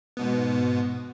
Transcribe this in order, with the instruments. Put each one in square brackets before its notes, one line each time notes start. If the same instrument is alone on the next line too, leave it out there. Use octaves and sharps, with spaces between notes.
[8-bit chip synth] G#2 B2 B3